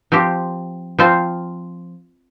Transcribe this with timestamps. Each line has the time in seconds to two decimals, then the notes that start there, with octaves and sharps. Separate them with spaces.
0.12 F3 C4 G4
0.99 F3 C4 F4 C5